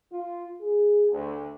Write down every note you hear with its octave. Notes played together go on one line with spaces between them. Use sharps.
F4
G#4
D2